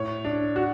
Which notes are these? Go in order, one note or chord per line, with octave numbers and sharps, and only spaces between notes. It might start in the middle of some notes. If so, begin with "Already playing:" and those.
Already playing: A2 C#5
D4
F#4